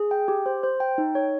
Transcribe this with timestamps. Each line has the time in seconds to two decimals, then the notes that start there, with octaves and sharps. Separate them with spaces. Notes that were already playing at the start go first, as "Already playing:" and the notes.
Already playing: G#4
0.11 G5
0.28 G4
0.46 C5
0.63 C5
0.80 G5
0.98 D#4
1.15 C#5